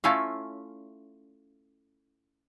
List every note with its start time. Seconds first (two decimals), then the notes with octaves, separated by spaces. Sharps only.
0.04 A3 C#4 E4 F4 E5 F5